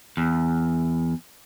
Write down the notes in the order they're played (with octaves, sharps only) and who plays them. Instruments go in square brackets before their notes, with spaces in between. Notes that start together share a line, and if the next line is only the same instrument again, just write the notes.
[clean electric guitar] E2